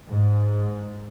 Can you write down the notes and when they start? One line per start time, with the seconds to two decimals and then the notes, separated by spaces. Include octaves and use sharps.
0.10 G#2